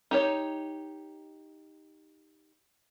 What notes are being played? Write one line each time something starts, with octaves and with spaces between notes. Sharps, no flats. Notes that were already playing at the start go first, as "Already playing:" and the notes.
D#4 G4 C#5